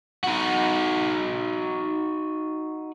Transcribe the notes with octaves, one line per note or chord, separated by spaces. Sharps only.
D#4 F#4